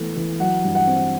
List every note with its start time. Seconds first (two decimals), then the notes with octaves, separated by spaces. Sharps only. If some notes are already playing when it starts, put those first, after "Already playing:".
Already playing: E3 A3 B3
0.16 E3
0.40 F#3 F#5
0.63 G2
0.75 F#5
0.87 C4